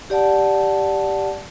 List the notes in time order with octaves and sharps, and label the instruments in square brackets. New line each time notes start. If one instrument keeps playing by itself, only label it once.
[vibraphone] G4 D5 F#5 A5